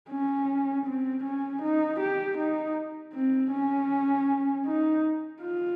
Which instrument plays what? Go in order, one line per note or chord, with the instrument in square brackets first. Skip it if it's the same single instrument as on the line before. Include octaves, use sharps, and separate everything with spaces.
[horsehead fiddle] C#4
C4
C#4
D#4
G4
D#4
C4
C#4
D#4
F4